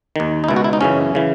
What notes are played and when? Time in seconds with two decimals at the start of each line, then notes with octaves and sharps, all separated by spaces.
0.16 D#2 D#3
0.44 D#4
0.48 C#2 B2 E4
0.56 F#4
0.64 E4
0.73 D#4
0.81 F#2 C#3 E3 C#4
1.15 C#3 E3